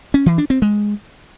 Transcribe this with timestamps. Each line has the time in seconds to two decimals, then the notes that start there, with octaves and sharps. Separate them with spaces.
0.14 C#4
0.26 E3
0.38 D4
0.50 C4
0.62 G#3